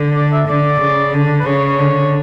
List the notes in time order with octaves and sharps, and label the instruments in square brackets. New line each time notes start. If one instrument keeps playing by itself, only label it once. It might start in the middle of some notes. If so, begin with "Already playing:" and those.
Already playing: [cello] D3
[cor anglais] D5
E5
[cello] D3 [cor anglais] D5
[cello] C#3
D3
[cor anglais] B4
[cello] C#3 [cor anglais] C#5
[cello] D3